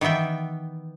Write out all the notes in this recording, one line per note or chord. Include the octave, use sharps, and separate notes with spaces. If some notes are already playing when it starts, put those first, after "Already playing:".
D#3 E3 B3 E5 G5